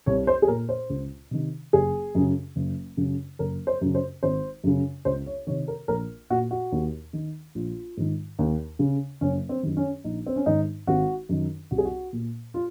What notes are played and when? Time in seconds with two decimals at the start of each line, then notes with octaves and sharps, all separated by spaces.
0.06 C2 C#5
0.27 C5
0.42 G#4
0.48 A#2 A#4
0.69 C5
0.90 C#2
1.31 C3 D#3
1.73 F#1 G#4
2.15 F#2 C#3
2.56 F#1
2.97 F#2 C#3
3.39 F#1 A#4
3.67 C5
3.81 F#2 C#3
3.95 C5
4.23 G#1 C5
4.64 F#2 C#3
5.05 C#2 C5
5.26 C#5
5.47 D#3 C#5
5.49 C3
5.68 A#4
5.88 A#1 A#4
6.30 A#2 F#4
6.51 F#4
6.72 D#2
7.13 D#3
7.55 A#1 F4
7.97 G#2 D#3
8.39 D#2
8.79 C#3
9.21 F#1 C#4
9.49 C4
9.63 F#2 D#3
9.77 C#4
10.04 A#1 D#4
10.26 C4
10.36 C#4
10.46 G#2 D#3 D#4
10.87 G#1 F#4
11.29 F#2 D#3
11.71 C2 F#4
11.78 G#4
11.85 F#4
12.13 A#2
12.54 F4